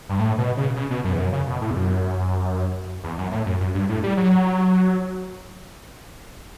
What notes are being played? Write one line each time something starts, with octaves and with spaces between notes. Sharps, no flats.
G2
A2
B2
C#3
C#3
B2
F#2
E2
F#2
C#3
B2
A2
E2
F#2
E2
F#2
A2
F#2
F#2
G2
A2
G3
F#3